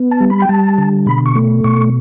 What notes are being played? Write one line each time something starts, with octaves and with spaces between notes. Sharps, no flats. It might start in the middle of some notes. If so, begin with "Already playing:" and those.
Already playing: B3
A5
G3
B5
G5
G3 A5
D3
B2 B5
C#6
A3
B2 C#6